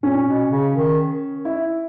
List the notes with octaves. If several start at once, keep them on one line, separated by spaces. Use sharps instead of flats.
A#2 C#4
B2
C#3
D#3
E4